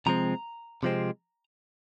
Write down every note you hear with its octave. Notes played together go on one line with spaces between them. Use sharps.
C3 F3 G#3 C4 A#5
C3 F3 G#3 C4